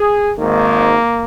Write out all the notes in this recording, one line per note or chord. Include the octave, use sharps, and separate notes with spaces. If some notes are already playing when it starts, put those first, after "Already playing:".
Already playing: G#4
G#1 G#2 D#3 A#3